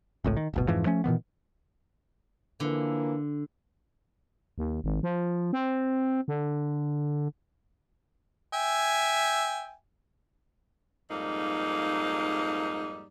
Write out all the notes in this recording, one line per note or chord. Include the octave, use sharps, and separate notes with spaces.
G#1 C#2 A2
D#3
D1 G1 B2
F2 G#2 E3 F3
F3 A3 C#4
A#2 D#3 E3 B3
D3 E3 F3 A#3
D#2
G#1
F3
C4
D3
E5 G5 G#5
F2 G#2 G3 A#3 D#4